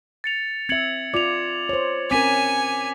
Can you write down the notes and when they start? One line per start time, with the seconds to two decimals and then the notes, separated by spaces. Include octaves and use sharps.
0.24 A6 C#7 F7
0.69 C4 E5 G#6 C#7 F#7
1.14 F4 D5 D6 F7
1.69 C5 C#5
2.11 C4 C#4 A#4 G#5 D6 B6 D#7